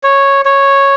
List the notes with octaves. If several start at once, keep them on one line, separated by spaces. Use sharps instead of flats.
C#5
C#5